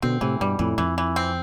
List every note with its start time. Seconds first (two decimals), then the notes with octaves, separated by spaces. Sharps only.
0.02 B2 D3 C4
0.21 A2 C3 E3
0.40 G2 B2 G3
0.59 F2 A2 E3
0.78 F2 E3
0.98 E3
1.16 C4